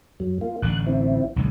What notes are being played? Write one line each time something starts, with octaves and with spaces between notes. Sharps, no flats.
F#2 F#3
A#3 F4
A1 D3 F#6
C4 E4
B1 D3 G#3